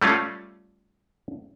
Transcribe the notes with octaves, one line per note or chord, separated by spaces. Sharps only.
G3 A3 C#4 F4